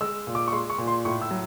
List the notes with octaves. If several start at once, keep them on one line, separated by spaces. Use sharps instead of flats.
G#3 E6
A#2
D6
C#6
G#3 C6
C#6
A#2
C6
A2 C#6
E6
F#3